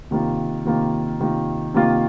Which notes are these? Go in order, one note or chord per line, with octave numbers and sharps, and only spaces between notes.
C3 D#3 A#3 F4
C3 D#3 A#3 F4
C3 D#3 A#3 F4
C3 D#3 A#3 F4